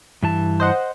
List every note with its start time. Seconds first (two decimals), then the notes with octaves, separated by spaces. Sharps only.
0.23 G2 E3 A5
0.60 C5 D#5 F#5